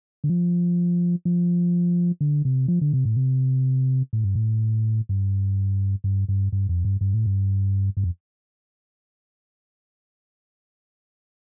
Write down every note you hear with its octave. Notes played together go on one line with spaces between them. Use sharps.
D3
F3
F3
D3
C3
F3
D3
C3
A2
C3
A2
G2
A2
G2
G2
G2
G2
F2
G2
G2
A2
G2
G2
F2